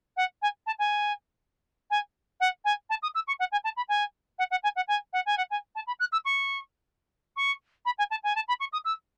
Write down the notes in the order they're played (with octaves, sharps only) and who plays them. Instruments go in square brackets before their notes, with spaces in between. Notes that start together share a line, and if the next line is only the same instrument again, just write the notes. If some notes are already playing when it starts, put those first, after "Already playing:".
[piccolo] F#5
G#5
A5
G#5
G#5
F#5
G#5
A5
D#6
E6
C#6
F#5
G#5
A5
B5
G#5
F#5
F#5
G#5
F#5
G#5
F#5
G#5
F#5
G#5
A5
B5
F#6
E6
C#6
C#6
B5
G#5
A5
G#5
A5
B5
C#6
D#6
E6